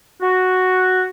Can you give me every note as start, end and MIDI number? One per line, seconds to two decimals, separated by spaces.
0.21 1.06 66